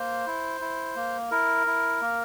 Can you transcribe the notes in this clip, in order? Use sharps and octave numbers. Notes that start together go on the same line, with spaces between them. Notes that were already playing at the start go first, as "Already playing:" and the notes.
Already playing: A#3 C5
E4
E4
A#3
E4 A#4
E4
A#3